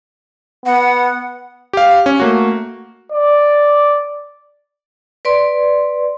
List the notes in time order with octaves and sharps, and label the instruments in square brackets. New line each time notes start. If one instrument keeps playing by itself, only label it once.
[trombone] B3 [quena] F#5
[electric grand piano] G4 F5
C#4
A3 A#3 F#4
[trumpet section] D5
[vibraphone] B4 D5 C6